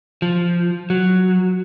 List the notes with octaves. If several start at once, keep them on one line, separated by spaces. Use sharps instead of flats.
F3
F#3